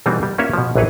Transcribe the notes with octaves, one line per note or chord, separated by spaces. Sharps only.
B2 E3 G3 A#3 C4 D#4
G3
A#3 C#4 F4 B4 C#5 E5
B2 F3
A#1 E3 F#3 G#4 B4 C#5